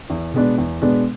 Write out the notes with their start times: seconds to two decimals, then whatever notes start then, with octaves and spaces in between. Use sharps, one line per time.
0.10 E2
0.34 B2 G#3 B3 D4
0.58 E2
0.82 B2 G#3 B3 D4